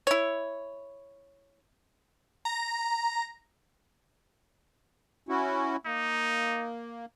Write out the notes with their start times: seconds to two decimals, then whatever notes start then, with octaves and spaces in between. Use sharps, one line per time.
0.07 E4 C#5
2.45 A#5
5.29 C#4 E4 F#4
5.86 A#3 D#4